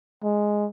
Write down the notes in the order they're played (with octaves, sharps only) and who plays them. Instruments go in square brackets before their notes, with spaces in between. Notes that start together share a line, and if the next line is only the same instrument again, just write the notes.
[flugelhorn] G#3